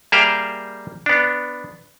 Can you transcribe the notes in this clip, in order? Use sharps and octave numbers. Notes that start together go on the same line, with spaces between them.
G3 A#3 G#4 E5 F5 G5
B3 D4